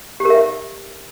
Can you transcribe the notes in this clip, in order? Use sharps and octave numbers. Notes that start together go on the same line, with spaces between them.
G4
A#4
E5